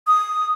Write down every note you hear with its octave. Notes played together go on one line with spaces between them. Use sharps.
D#6